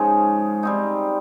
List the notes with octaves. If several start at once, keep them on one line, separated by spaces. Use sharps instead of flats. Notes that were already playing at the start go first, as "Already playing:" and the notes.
Already playing: G#2 F3 G#3 C#4
G3 C4 D#4